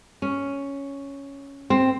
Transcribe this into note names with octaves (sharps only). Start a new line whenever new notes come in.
C#4
C4